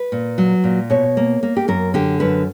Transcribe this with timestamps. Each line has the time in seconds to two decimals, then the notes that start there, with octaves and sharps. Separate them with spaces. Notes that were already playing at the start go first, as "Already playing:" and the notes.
Already playing: B4
0.12 A#2
0.38 F#3
0.64 A#2
0.90 B2 C#5
1.17 A#3
1.43 A#3
1.57 G4
1.68 F#2 A#4
1.94 D3 G4
2.20 F#2 B4